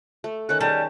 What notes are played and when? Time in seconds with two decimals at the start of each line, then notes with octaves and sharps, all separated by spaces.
0.24 A3
0.49 D#3 C#4 A4 F#6
0.61 G3 G#4 A5